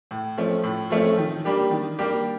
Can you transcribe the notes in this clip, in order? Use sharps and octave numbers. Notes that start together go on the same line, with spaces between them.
A2
F3 A3 C#4
A2
F3 A3 C#4
D#3
G3 A#3 D4 G4
D#3
G3 A#3 D4 G4